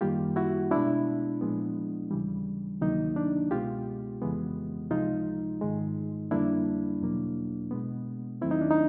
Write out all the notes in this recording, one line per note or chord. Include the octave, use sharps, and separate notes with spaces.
F#2 D#3 G3 A#3 F4 G4
E4 F#4
B2 G#3 B3 D4 E4
A#2 F3 G#3 B3
D#2 C#3 E3 G3
D2 C3 D#3 F#3 A#3 D#4
D4
C#2 B2 G#3 B3 F4 G4
F2 C#3 E3 G#3 B3
C#2 C3 F3 G#3 D#4 F4
G#2 D#3 G#3
F2 D3 G3 A#3 D4 E4
E2 B2 F#3 A#3
B2 G#3 B3
D#2 D#3 F#3 A3 C4 E4
D#4
D4
D#4